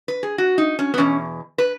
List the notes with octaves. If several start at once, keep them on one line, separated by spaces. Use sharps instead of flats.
B4
G#4
F#4
D#4
C#4
B3
E2 B2 C#4
B4